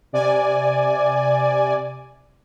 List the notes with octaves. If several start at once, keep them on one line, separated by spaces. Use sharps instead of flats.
C3 D5 G#5